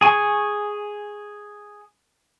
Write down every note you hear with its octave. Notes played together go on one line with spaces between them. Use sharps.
G#4 G#5 C#6